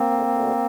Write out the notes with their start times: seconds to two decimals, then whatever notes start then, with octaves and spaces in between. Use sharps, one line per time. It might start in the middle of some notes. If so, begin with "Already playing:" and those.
Already playing: A#3 C4
0.11 D2
0.27 D2